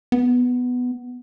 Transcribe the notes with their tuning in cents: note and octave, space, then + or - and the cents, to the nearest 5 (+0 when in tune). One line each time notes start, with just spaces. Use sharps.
B3 +5